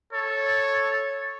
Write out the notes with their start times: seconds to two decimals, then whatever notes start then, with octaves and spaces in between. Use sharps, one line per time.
0.13 A4 C#5